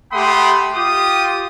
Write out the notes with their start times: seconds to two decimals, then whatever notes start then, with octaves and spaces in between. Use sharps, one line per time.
0.12 A3 G4 F#5 B5 C6 D#6
0.75 F4 G4 D#6